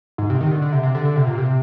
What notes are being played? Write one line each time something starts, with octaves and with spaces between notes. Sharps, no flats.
G#2
C3
D#3
D3
D3
C3
C3
D3
D3
C3
A#2
C3